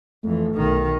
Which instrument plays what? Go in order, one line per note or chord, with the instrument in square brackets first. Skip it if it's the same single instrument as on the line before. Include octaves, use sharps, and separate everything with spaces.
[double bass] F2 E3 [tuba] A3
[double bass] B1 D#3